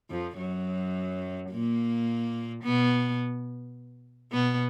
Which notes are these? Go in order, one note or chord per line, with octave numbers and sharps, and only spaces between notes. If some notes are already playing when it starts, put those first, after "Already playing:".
F2 F3
F#2 F#3
A#2 A#3
B2 B3
B2 B3